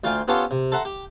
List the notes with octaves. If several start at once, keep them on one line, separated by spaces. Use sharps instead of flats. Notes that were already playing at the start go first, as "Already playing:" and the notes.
D2 F4 F5 G5 G#5
B3 C#4 F4 G4 A4 C5
C3
A4 C5 E5 F#5 A#5
G4